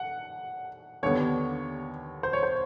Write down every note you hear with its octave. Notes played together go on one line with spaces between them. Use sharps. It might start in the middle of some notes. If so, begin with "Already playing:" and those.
Already playing: F#5
D#2 D3 G3 B3 C#5
C5
C#5
C5